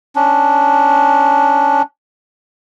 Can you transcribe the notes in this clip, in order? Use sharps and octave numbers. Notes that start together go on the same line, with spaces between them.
C#4 D4